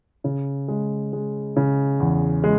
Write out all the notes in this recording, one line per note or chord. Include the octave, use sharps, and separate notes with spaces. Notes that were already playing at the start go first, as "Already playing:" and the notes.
C#3
G#3
G#3
C#3
E2
G#3